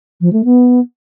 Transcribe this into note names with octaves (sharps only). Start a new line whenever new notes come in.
F3
A3
B3